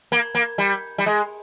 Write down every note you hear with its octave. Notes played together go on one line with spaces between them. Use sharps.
A#3
A#3
G3
G3
G#3